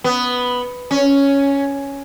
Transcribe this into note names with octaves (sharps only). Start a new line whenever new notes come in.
B3
C#4